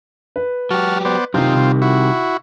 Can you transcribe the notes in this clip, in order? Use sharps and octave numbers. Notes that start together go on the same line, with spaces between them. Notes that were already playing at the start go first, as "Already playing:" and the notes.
B4
F#3 F#4 G4 A5 F6
B3 C5 D5
F#2 C3 D#3 C4 D#4 F4
C2
E4 F#4